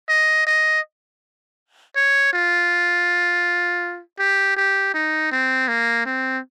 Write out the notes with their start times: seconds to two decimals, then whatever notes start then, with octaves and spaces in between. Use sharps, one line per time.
0.09 D#5
0.46 D#5
1.96 C#5
2.33 F4
4.19 G4
4.56 G4
4.94 D#4
5.32 C4
5.68 A#3
6.06 C4